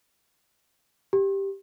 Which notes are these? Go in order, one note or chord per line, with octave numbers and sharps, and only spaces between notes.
G4